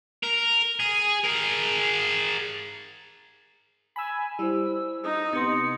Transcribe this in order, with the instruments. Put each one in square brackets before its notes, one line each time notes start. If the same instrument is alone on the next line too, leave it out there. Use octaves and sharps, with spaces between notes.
[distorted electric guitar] A#4
G#4
G#4 A#4
[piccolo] G#5 [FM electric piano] B5 E6
[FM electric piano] G3 [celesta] E4 C5 [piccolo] E6
[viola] D#4 [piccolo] D#6
[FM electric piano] C3 B3 [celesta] C6 D#6 [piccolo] C#7